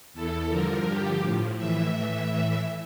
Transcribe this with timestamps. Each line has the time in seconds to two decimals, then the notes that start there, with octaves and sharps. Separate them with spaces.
0.14 E2 E3 A4
0.50 G2 D3 F3 A#4
0.85 G2 D3 F3 G4
1.22 A2 F3
1.57 A2 E3 E5
1.92 A2 E3
2.28 A2 E3